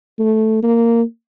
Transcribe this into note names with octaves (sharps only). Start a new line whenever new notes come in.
A3
A#3